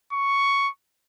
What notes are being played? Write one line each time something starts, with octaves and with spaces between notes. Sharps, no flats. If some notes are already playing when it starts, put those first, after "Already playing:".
C#6